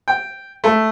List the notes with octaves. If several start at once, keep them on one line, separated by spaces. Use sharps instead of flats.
G5
A3